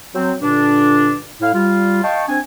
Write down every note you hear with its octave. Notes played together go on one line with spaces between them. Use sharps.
F#3 C4
G2 A#2 D3 D4
A2 E4 F5
G3 F4
D#5 F5 G5 A5 C#6
C4 D4 G#5